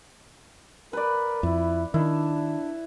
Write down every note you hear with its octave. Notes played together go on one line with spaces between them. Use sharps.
A#4 B4 D5
F2 E4
D#3 D4 E4